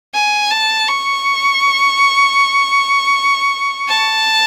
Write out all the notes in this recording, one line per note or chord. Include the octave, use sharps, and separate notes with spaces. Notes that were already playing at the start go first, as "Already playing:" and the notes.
G#5
A5
C#6
A5